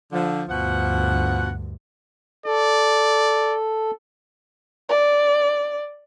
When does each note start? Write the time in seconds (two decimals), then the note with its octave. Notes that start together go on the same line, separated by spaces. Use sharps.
0.12 D3 F3
0.48 D2 G2 B2 F3 F#5
2.46 A4 D5
4.89 D5